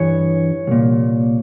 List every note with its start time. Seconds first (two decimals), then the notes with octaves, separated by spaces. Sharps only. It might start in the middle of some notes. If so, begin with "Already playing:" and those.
Already playing: G2 E3 C#5
0.67 C2 A#2